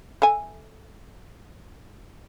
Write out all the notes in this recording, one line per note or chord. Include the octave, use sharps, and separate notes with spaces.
A4 E5 G#5